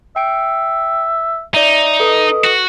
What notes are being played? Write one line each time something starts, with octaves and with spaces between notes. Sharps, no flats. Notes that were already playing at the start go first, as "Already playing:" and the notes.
E5 G5 D7
D#4 D5 E5
A4 B4 D#5
F#4